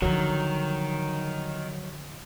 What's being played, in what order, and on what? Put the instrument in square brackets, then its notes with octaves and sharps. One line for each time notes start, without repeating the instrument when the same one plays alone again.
[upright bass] D3 F3 [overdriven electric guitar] D#3 [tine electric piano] F#3